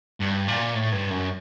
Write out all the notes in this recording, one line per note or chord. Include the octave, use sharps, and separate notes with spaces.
G2
A#2
A2
G2
F#2